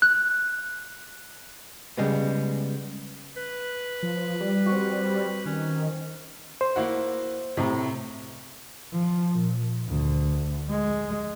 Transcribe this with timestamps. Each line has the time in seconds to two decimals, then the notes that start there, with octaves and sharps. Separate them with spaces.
0.02 F#6
1.97 C#3 G3 G#3 B3
3.37 B4
4.03 F3
4.41 G3 D5
4.66 C4 F#4
5.46 D#3 C#4
6.61 C5
6.76 A#3 E4 F#4
7.57 A2 C3 A#5
8.92 F3
9.39 A#2
9.88 D2
10.69 G#3